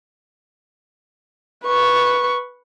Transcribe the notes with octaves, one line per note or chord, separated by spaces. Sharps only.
B4 C#6